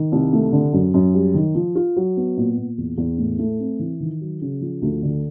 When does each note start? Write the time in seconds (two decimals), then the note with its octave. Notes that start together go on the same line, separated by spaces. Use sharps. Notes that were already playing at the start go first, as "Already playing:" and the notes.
Already playing: D#3
0.12 C2
0.33 A3
0.52 D3
0.73 F#2
0.94 F#2
1.14 G3
1.34 D#3
1.55 F3
1.75 F4
1.96 F#3
2.17 B3
2.37 A#2
2.57 A#2
2.78 E2
2.97 E2
3.18 A2
3.39 A3
3.60 C4
3.79 E3
4.00 D#3
4.21 F#3
4.41 C#3
4.61 F3
4.82 D2
5.02 D3